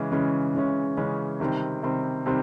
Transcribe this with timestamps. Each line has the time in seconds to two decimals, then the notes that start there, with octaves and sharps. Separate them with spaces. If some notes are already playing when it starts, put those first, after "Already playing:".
Already playing: C#3 E3 G#3 C#4
0.12 C#3 E3 G#3 C#4
0.55 C#3 E3 G#3 C#4
0.97 C#3 E3 G#3 C#4
1.40 C3 D#3 G3 C4
1.83 C3 D#3 G3 C4
2.26 C3 D#3 G3 C4